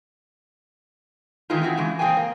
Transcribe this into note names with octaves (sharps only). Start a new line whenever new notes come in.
D#3 E3 G#3 A3 D#4 F4
C4 E4 F#4 G#4
C#3 E3 G#3
A#3 C4 G#4 F5 G5 G#5
A#3